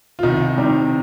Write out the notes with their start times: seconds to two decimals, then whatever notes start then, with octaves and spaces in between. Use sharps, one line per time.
0.19 F4
0.23 C2 D#3 D#4
0.56 C3 D#3 G3